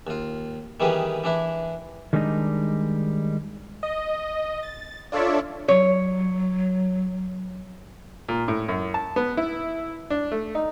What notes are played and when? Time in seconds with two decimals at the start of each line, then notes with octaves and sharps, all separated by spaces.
0.07 D#2 F4
0.80 D#3 E3 G3 B3 G4 G#4
1.24 E3 D4 E4
2.13 D#3 G3 G#3 D4 D#4
3.83 D#5
4.63 A6
5.12 D4 F4 A4 C#5 D5 E5
5.68 F#3 C#5
8.29 A#2
8.48 A2
8.68 F#2
8.94 A5
9.16 B3
9.37 E4
10.10 D4
10.32 A3
10.55 D#4